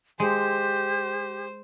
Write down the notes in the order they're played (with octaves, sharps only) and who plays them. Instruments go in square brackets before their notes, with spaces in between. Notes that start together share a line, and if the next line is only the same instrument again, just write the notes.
[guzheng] G#3 [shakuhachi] G4 [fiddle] C5